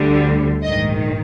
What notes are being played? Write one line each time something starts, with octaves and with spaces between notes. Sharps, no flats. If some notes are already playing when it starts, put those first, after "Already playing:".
Already playing: D2 D3 G3
A#1 G#2 D#3 D#5